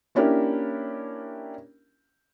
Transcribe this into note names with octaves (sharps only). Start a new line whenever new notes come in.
A#3 C#4 D4 E4 G4 A#4